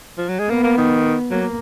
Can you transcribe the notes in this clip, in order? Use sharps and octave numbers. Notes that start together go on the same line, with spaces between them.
F3
F#3
G#3
A#3 B3
A#3
D#3
F#3 A#3